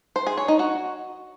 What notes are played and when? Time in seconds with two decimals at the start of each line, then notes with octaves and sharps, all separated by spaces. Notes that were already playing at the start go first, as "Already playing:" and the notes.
0.16 C5
0.27 G#4
0.37 C#5
0.48 D#4
0.59 F#4